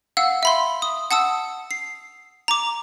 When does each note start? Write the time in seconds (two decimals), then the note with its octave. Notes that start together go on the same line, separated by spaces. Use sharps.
0.17 F5 F#5 E6
0.43 E5 B5 C6
0.82 D#6
1.11 F#5 A5 D#6 E6
1.71 C7
2.48 A#5 D6